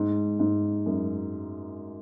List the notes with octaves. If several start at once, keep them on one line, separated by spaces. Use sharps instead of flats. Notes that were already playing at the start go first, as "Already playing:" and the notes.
Already playing: G#2
G#2
F#2